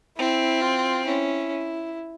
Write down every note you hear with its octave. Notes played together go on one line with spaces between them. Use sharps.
C4 E4
F4
C#4 E4